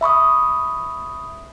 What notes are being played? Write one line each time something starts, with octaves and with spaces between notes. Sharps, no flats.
E5 B5 C#6 D#6